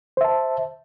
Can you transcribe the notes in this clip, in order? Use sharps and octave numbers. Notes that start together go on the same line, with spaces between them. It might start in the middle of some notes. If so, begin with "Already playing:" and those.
C5 E5 A5